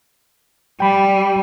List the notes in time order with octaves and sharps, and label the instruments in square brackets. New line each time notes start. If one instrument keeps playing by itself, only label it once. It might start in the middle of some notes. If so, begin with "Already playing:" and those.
[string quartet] G3 [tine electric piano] G5 B5